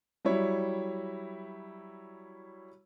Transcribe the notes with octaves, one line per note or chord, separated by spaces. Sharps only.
F#3 G3 E4 C#5